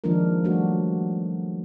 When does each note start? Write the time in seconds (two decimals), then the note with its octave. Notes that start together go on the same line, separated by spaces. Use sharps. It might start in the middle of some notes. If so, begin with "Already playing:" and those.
0.04 D#3 F3 G#3 A#3 D4 A#4
0.44 F#3 G3 A3 D4 F#4